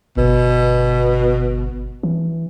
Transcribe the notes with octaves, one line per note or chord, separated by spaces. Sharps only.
G1 B2
E3